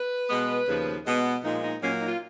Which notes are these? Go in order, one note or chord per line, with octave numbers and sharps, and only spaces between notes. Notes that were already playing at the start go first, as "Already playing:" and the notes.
Already playing: B4
B2 G#3 B3
D#2 C#3 F3
B2 G#3 B3
A#2 F3 G#3 D#4
D#4
A#2 F#3 A#3 C#4
D#4
F4